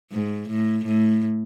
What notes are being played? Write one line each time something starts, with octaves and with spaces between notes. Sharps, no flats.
G#2
A2
A2